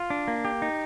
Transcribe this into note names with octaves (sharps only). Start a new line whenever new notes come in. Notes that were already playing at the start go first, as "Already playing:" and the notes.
Already playing: F4
D4
A#3
G4
D#4